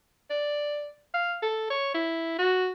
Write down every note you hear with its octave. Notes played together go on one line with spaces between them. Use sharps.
D5
F5
A4
C#5
E4
F#4